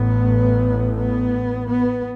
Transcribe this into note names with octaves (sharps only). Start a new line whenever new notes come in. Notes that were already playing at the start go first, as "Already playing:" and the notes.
Already playing: A1 A2 B3
B3
B3